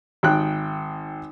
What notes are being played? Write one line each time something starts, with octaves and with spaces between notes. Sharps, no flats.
G#1 G5 F#6